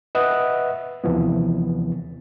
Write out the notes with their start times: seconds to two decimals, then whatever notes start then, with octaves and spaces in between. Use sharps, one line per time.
0.15 B4 D#5 E5 F#5 D#6 F#6
1.04 D#2 C3 E3 F3 B3